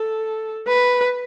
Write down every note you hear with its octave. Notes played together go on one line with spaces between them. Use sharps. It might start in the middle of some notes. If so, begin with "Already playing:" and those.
Already playing: A4
B4